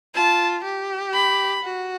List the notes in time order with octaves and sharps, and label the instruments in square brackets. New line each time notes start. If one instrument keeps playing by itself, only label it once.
[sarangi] F4 [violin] A5
[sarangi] G4
[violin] B5
[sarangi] F#4